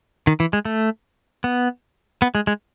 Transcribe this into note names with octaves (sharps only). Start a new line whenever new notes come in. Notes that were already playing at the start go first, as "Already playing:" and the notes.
D#3
E3
G#3
A3
B3
B3
G#3
G#3